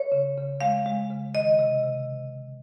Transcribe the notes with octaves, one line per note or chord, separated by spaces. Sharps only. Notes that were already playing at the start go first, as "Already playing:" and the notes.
Already playing: C#5
C#3
C#3
G#3 F5
G#3
C#3
D#3 D#5
C3
C3